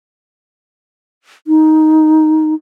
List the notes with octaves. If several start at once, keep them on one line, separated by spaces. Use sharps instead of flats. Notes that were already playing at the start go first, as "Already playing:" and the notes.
D#4